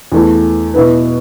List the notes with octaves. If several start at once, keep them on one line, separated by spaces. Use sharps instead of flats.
E2 E3 A3
B2 B3 E4 B4